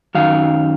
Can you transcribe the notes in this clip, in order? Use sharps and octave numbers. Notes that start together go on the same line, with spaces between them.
F#2 D#3 F#3 F5